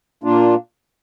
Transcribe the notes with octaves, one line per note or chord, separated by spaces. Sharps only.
A#2 A#3 D4 F4